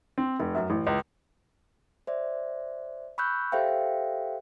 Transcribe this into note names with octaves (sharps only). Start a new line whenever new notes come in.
C4
F1
F#2
A1
C#2
C5 D5 E5
B5 C#6 E6 F#6 G6
G4 A4 C5 E5 F5 G5